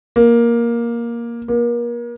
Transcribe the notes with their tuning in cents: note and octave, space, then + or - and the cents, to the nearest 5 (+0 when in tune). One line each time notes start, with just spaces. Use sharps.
A#3 +10
A#3 +35